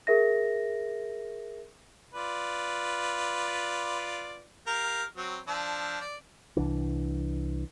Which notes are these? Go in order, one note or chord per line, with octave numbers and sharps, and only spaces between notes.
G#4 A#4 E5 A#6
F4 B4 D5
G4 A#4 F5
F#3 C4
F3 D4 E6
D5
C2 E3 D4